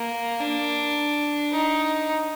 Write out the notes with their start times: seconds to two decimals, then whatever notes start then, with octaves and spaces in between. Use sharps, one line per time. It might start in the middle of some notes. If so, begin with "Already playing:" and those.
Already playing: A#3
0.40 D4
1.52 D#4